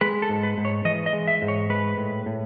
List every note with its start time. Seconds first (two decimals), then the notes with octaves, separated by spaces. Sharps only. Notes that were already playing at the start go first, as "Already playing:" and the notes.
0.01 G#3 B4
0.22 A4
0.29 G#2
0.43 B4
0.58 G#2
0.65 C#5
0.85 E3 D#5
1.06 D#5
1.13 G#3
1.27 E5
1.42 G#2
1.48 C#5
1.69 G#3 B4
1.98 A2
2.26 A2